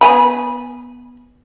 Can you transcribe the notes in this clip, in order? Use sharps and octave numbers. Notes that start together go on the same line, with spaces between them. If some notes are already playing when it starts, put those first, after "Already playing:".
B3 G#5 B5